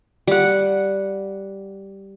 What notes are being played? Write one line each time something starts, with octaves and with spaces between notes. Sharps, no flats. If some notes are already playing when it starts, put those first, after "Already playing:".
G3 F#5